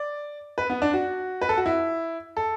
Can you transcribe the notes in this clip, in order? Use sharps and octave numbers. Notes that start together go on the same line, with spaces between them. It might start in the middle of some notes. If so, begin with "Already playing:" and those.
Already playing: D5
B4
B3
D4
F#4
B4
A4
F#4
E4
A4